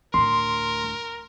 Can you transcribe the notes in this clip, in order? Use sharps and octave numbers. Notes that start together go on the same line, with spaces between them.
D2 A2 A#4 C6